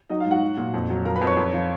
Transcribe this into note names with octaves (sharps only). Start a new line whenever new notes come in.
F#3 D#4 D#5
F4 F5
G#2
F#4 F#5
F#3
A#2
F2
F#3
F3 A#4 A#5
B4 B5
F2
C#5 C#6
F2
F3